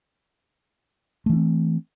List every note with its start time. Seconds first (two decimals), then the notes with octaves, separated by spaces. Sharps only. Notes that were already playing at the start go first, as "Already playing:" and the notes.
1.26 A3
1.29 E3
1.33 D4
1.36 C4